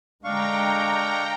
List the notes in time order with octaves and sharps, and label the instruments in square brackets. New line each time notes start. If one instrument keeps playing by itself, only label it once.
[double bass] D3 G#3 [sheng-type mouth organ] D4 F5 C#6 [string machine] G5 A#5